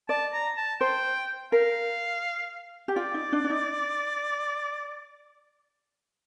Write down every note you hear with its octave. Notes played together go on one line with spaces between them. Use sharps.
D5 A5
A#5
A5
C5 G5
A#4 F5
G4
F4 D5
D#4
D4
D4
D#4